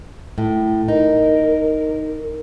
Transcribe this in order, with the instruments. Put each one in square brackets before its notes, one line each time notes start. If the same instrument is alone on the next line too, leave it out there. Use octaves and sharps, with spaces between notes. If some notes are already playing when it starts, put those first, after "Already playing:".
[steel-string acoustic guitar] A2
[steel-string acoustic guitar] D#4 [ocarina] A#4